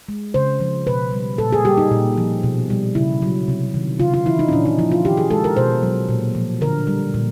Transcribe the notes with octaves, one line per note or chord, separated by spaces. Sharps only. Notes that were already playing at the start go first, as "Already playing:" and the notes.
G#3
C#3 C5
F3
B2 B4
G3
A#2 A4
G#4
G3 G4
D#4
A#2
F3
B2
G3
C#3 E4
F#3
C3
D#3
C#3 F4
F4
E3 E4
D#4
C#4
A#2 D4
D#4
F3 E4
F4
D#3 G4
G#4
G#3 A4
A#4
B2 C5
F#3
A#2
F3
D3 A#4
G3
A#2